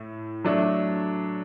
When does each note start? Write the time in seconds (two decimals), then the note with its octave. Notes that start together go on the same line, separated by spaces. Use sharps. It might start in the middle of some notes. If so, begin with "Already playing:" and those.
Already playing: A2 A3
0.45 F#3 A3 D4